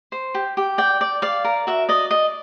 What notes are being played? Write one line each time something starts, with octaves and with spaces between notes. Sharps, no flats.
C5
G4
G4
D5 G5
D5
D5 F5
A#4
F#4 E5
D5 D#5
D5 D#5